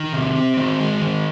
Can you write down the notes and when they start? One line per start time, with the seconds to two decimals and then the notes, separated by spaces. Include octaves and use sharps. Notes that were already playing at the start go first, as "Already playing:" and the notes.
Already playing: D#3
0.13 C3
0.36 C4
0.57 D#3
0.80 G#3
1.02 D#3